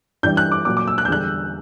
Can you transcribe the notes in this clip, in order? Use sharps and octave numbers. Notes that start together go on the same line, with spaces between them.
G2 E3 G3 G6
F#6
D6
A#2 F#3 D6
D6
E6
F#6
G6
E2 D3 G3 F#6